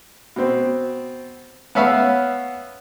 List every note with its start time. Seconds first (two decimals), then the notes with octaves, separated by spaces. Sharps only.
0.36 B2 C4
1.75 B3 C#4 B4 E5 F5 B5